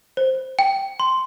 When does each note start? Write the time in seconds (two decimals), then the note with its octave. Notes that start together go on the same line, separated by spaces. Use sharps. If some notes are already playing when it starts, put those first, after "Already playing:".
0.17 C5
0.59 G5
1.00 C6